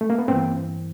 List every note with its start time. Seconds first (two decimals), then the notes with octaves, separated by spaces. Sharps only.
0.01 A3
0.10 A#3
0.19 B3
0.28 G2 E3 A#3 C4